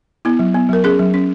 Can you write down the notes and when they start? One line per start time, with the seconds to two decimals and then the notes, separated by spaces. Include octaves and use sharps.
0.25 B3 E4
0.39 F#3
0.54 B3
0.69 F#3 A#4
0.84 C#4 G#4
0.99 F#3
1.14 C#4